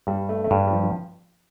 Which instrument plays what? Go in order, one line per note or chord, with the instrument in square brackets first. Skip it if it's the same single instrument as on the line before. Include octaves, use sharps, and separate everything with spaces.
[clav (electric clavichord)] G2 [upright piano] G3
[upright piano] A3
A3
[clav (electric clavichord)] G2 [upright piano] G3
[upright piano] G3
F3
F3